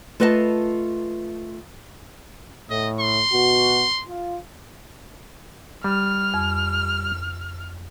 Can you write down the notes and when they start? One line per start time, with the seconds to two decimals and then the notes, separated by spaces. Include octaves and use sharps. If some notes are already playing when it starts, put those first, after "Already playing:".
0.20 A3 F4 B4 D#5 E5 A5
2.70 A2 D#5
3.00 C6
3.32 B2 F#4
4.08 F4
5.84 G3 F6
6.34 F2